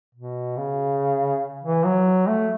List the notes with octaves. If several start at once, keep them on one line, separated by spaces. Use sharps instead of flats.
B2
C#3
E3
F#3
A3